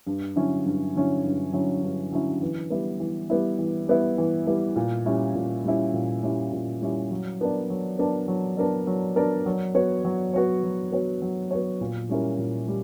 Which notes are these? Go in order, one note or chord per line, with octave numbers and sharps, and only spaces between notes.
G2
D3 F#3 C#4 E4
G2
D3 F#3 C#4 E4
G2
D3 F#3 C#4 E4
G2
D3 F#3 C#4 E4
E3
G3 B3 E4
E3
G3 B3 E4
E3
G3 B3 E4
E3
G3 B3 E4
A#2
G3 C#4 E4
A#2
G3 C#4 E4
A#2
G3 C#4 E4
A#2
G3 C#4 E4
F#3
B3 D4 A#4 D5
F#3
B3 D4 A#4 D5
F#3
B3 D4 A#4 D5
F#3
B3 D4 A#4 D5
F#3
B3 F#4 C#5
F#3
B3 F#4 C#5
F#3
B3 F#4 C#5
F#3
B3 F#4 C#5
A#2
G3 C#4 E4 A#4
A#2
G3